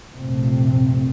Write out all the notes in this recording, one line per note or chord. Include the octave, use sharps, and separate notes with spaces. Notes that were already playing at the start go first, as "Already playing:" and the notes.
A#1 F#2 C3 F3 A3 C4